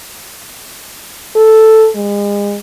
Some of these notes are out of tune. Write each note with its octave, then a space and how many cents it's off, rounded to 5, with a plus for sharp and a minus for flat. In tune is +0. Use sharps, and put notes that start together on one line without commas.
A4 +0
G#3 -35